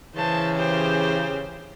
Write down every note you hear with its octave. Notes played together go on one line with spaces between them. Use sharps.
C#3 E3 C5 A5
G4 C5